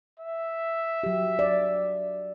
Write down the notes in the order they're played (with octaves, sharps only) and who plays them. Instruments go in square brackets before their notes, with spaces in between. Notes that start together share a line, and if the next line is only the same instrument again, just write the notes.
[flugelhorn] E5
[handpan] F#3 G4
D5